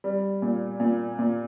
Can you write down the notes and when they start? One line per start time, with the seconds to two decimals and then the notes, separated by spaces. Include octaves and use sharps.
0.04 G3
0.42 A#2
0.80 A#2
1.19 A#2